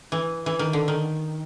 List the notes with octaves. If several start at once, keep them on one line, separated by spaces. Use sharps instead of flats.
E3
E3
D#3
D3
D#3